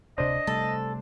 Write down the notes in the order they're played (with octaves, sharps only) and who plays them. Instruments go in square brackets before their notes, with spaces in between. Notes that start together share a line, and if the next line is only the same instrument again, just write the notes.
[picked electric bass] D1 C3 [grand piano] D4 C5 [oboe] D#5
[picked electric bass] C3 G3 A3 [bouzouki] A4